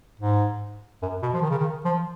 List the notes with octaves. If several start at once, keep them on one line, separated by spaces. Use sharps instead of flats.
G#2
F#2
B2
F3
D#3
C#3
D#3
F3